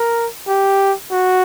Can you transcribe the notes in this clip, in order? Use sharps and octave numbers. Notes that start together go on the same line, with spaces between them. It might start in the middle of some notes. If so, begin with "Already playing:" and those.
Already playing: A#4
G4
F#4